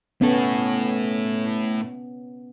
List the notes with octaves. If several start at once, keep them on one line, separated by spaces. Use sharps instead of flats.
A2 B3 C#4 A4